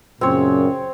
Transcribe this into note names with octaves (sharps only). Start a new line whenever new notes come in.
F#2 A#2 C#3 C4 C#5